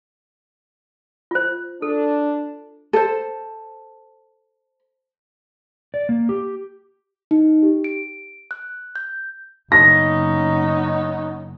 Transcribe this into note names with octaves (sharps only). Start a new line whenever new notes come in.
F4 C5
D4 A4
A4 C5
D5
A#3
G4
D#4
G4
D7
F#6
G6
F#1 B3 C#4 D#4 A#6